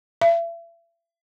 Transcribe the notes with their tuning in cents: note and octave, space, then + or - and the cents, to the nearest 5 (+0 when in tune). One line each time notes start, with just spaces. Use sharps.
E5 +40